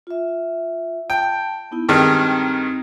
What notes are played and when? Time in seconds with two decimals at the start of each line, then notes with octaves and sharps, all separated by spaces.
0.07 F4 E5
1.10 G5 A5
1.71 B3 D#4 E4
1.89 G2 D#3 G#3 C4 D#4